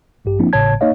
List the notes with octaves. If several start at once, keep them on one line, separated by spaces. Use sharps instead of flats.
A1 G2 G4
F3 A#3 C4 D4 E4
G#1 A2 C#3 C#5 A5 G#6
A#3 D#4 C#5 D#5 F5